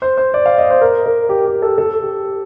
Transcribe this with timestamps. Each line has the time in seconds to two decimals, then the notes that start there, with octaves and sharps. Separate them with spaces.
0.02 C5
0.17 C5
0.34 D5
0.46 F5
0.58 D#5
0.70 C5
0.81 A#4
1.06 A#4
1.29 G4
1.46 G4
1.62 A4
1.78 A4
2.02 G4